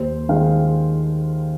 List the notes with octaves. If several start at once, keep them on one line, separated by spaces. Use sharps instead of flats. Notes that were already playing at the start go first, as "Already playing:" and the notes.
Already playing: D#2 C5
D#3 G#3 F5